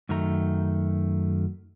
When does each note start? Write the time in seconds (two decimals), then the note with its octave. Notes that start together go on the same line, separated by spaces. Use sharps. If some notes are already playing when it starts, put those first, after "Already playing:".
0.09 F#2 D#3 A3 A#5